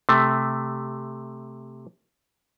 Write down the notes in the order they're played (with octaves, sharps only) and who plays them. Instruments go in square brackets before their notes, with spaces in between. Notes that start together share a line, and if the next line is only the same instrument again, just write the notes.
[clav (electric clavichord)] C3 A3